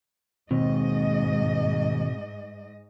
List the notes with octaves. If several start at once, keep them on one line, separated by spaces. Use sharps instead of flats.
D#2 G#2 B2 C4 D#5